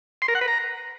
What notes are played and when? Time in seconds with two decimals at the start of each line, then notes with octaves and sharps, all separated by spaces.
0.22 C6
0.28 A#4
0.35 F#5
0.41 B4
0.48 A#5